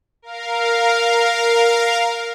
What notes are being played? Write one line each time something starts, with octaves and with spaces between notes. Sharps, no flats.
A#4 F5